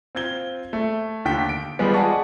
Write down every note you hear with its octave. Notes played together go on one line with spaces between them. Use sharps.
C4 F4 G#6 G7
A3
D#2 D3 G5 B6
D7
F3 G3 G#3 B3
G#4 D5 D#5 F#5 A5 C#6